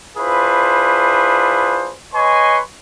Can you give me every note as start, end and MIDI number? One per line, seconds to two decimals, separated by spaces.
0.17 1.93 62
0.17 1.93 64
0.17 1.93 65
0.17 1.93 68
0.17 1.93 71
0.17 1.93 72
2.14 2.59 71
2.14 2.59 73
2.14 2.59 75
2.14 2.59 80
2.14 2.59 84
2.14 2.59 85